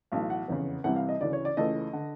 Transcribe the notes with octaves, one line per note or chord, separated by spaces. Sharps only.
B1 A2 E3 A3 F5
F#5
F1 E2 C#3
C2 C3 E3 G3 F#5
F5
D#5
D2 C#3 E3 D5
C#5
D5
C#2 C#3 E3 A3 D#5
D3